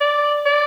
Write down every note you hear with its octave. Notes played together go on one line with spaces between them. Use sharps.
D5
D5